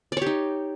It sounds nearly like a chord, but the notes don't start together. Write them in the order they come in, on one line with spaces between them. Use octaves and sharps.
D5 C#5 G4 D#4